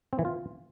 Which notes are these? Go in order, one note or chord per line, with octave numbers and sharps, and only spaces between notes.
C4
E3
F4